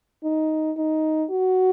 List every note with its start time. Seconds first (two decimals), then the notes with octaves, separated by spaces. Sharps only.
0.24 D#4
0.77 D#4
1.30 F#4